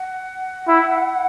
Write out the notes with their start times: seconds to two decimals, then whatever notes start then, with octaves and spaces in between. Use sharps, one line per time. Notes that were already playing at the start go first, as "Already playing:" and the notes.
Already playing: F#5
0.68 E4